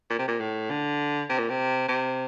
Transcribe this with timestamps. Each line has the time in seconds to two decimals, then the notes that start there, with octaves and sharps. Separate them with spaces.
0.10 A#2
0.19 C3
0.28 A#2
0.40 A2
0.70 D3
1.29 C3
1.39 A#2
1.49 C3
1.88 C3